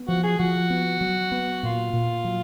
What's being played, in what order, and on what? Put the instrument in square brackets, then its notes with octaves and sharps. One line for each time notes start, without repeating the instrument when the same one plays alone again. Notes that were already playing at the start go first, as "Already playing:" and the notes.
Already playing: [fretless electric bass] B3
[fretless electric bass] F3 [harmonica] F#4
[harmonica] G#4
[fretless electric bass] F3 [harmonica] F#4
[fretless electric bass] B3
F#3
B3
[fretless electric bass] A#2 [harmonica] F4
[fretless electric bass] A#2
F#3